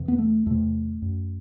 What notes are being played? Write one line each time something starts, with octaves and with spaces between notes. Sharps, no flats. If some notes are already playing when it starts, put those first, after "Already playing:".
Already playing: E2 C3
B3
A3
E2 C3 A3
F#2